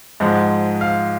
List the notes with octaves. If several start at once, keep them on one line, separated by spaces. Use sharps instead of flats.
G#2 F3 G#3 F#5
F5